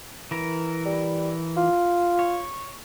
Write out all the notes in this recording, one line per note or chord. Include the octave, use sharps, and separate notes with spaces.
E3 A#4
G3
F4
C#5